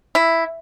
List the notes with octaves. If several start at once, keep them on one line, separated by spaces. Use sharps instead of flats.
E4